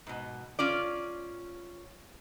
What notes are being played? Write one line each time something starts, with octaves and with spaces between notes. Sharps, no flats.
G#2 B2
C#4 F4 D5